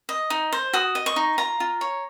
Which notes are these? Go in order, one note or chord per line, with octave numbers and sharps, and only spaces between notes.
D#5
D#4
C5
F#4 D#6
D#5
C#6
D#4
F4 A#5
F4
C#5